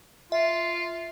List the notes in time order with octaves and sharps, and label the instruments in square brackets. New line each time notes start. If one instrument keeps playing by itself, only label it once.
[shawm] F4 [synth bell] E5